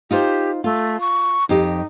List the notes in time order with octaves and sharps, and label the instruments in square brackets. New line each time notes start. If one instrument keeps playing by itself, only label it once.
[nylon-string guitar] D#4 F4 C5 [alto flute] G4
[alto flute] A3 [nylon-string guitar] F4
[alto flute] C#6
[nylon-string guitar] F2 G4 [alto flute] D#4